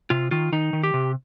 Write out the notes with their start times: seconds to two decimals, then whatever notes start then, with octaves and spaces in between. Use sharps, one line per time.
0.10 C3 F4
0.31 D#3 F4
0.52 D#3 D#4
0.73 D#3
0.83 G4
0.94 C3